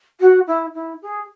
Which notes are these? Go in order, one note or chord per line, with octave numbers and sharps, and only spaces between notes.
F#4
E4
E4
G#4